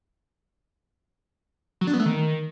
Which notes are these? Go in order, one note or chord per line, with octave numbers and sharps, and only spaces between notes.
F#3
D4
B3
A3
D#3